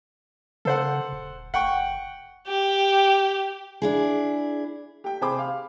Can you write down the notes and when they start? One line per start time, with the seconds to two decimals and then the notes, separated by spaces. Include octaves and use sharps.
0.65 C#3 A4 C5 F#5
1.12 D#1
1.54 F#1 F#5 G5 C#6
2.48 G4
3.82 D4 E4 G#4
5.04 G4 G5
5.21 C3 G#4 C5 B5 D6
5.39 F5